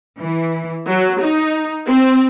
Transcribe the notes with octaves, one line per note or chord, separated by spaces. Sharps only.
E3
F#3
D#4
C4